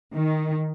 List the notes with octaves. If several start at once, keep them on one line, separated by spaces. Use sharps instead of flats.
D#3